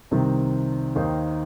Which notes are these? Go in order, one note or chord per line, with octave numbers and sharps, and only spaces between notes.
C2 C3 D#3 C4
D#2 D#3 A#3 D#4 C5